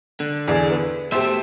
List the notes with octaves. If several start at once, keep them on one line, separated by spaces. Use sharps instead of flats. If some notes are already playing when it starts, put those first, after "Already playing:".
D3
E2 G#4 D5
B3
B2 A3 G4 C5 E5